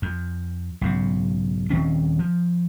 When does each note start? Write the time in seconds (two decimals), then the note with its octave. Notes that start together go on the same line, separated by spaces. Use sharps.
0.02 F2
0.81 B1 G#2 C#3
1.70 D#1 D#3 C4 C#4
2.19 F3